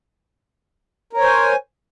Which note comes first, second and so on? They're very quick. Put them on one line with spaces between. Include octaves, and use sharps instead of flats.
A#4 C#5 C5 G#5